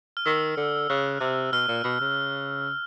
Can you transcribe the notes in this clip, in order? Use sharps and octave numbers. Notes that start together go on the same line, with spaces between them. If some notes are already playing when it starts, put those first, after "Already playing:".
F6
D#3 E6
D3
C#3 F#6
C3
B2 F6
A#2
B2
C#3